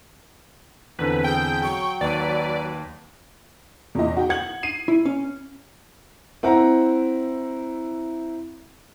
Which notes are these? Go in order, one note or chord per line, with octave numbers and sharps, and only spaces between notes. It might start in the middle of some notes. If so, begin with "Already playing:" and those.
E2 D3 C4 B4
G#4 G5 G6
F#3 C#6
D#2 B4 D5
E2 A#2 D#5
F#4 G5
F#5 G#6 F#7
C7 D#7
E4
C#4
C4 E4 F#5 A#5